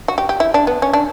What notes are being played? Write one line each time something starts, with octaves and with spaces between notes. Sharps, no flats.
F#4
G4
G4
E4
D4
B3
C#4
D4